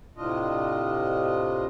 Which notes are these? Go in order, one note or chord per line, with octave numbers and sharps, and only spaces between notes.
A2 C3 D4 F4 D#5